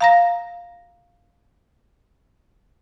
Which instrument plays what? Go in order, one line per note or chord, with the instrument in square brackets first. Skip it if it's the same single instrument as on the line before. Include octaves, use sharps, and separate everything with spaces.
[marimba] F5 A#5 A#6